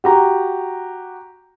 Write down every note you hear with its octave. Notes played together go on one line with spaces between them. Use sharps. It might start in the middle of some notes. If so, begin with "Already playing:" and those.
F#4 G4 A#5